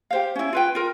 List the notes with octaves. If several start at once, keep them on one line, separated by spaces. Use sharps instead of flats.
G4 C5 F5
C#4 E4
F4 B4 G5
F4 A#4